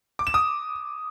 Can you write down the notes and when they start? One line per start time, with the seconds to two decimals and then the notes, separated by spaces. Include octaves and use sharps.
0.19 D6
0.27 E7
0.34 D#6